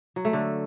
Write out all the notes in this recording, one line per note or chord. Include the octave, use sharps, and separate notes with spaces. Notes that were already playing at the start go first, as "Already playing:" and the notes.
F#3
A3
D3